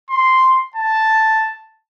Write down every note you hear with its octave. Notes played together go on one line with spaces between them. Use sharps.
C6
A5